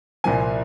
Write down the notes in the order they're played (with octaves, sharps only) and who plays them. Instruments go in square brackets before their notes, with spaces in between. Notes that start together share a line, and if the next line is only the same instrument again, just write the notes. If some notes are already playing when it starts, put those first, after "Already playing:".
[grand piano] C2 A#2 F3 A#3 G#5